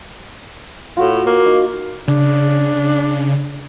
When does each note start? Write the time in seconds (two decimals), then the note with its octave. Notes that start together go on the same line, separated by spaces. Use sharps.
0.97 A2 F4 F#4
1.26 A#3
1.46 D#4
2.08 C#3 D4